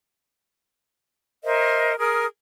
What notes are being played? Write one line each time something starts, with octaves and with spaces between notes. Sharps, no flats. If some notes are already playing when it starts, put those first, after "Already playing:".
A#4 C5 D#5 E5
G#4 A#4 D#6 F6